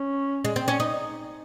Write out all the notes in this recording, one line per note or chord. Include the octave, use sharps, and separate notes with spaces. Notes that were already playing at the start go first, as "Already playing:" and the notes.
Already playing: C#4
G#3
C4
C#4
D#4